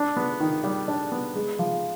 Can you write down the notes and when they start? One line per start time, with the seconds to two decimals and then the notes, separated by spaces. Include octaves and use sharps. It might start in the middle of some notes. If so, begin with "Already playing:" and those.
Already playing: D4
0.17 B3
0.40 D#3
0.64 G3
0.88 D4
1.12 B3
1.35 G#3
1.59 F3